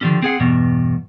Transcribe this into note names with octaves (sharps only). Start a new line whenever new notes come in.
D3 D#3 F3 G3 C#4
C4 G#4 F#5
E2 G2 B2